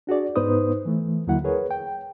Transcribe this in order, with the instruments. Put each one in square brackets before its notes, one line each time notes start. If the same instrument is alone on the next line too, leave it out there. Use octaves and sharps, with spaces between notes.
[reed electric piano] D4 F#4 G#4 D5
G#2 B3 D#4 B4 C5 D#6
E3 A3
D#2 D3 F#3 A#3 E4 F#5
G#4 A#4 B4 C#5
G5